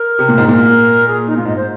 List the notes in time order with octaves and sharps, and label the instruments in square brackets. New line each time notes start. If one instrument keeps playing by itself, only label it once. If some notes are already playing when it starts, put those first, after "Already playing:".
Already playing: [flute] A#4
[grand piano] C3
A#2
G#2
[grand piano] A#2 [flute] A#4
[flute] G#4
D#4
[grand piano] A#2 [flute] F4
[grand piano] G#2 [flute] D#5
[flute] C5